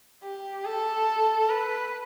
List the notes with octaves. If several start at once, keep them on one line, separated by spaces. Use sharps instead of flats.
G4
A4
B4